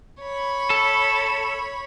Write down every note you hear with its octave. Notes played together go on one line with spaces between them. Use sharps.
C#5 B5
A4